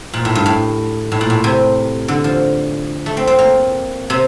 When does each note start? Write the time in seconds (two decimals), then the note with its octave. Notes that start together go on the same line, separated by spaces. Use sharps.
0.14 A#2
0.25 A2
0.35 G2
0.46 A2
1.12 A2
1.21 A#2
1.30 A2
1.44 C3
2.08 D3
2.24 F3
3.06 A3
3.17 C4
3.27 C4
3.39 A#3
4.10 C3